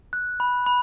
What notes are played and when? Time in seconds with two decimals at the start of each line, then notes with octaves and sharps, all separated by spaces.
0.13 F#6
0.40 B5
0.66 B5